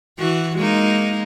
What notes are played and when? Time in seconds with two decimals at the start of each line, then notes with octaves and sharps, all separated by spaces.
0.19 E3 F#4
0.57 G#3 A#3 D#4